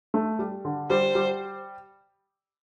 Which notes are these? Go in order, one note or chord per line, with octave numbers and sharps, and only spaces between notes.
A3
G3
D3
G3 C5
G3